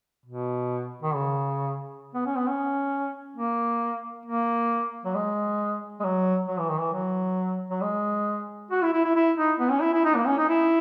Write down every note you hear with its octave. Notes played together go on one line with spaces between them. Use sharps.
B2
D#3
C#3
B3
C#4
B3
C#4
A#3
A#3
F#3
G#3
G#3
F#3
F#3
E3
D#3
E3
F#3
F#3
G#3
F#4
E4
E4
E4
E4
D#4
B3
C#4
E4
E4
D#4
A#3
C#4
D#4
E4